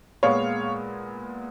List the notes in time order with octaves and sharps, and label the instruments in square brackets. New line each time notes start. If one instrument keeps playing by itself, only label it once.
[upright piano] A#2 G#3 B3 C#5 F5